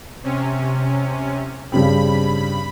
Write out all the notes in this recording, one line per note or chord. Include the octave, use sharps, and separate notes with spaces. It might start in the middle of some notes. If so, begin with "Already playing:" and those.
C3 C#4
G2 C#3 C4 B5